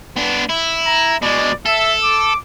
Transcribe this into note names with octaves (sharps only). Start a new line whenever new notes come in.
B3 D4
E4
A#5
B2 G#3 D5
A4 E5
D6